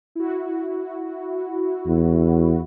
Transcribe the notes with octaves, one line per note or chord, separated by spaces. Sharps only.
E4 F#4
E2